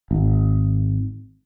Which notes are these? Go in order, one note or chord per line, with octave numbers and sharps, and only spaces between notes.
G#1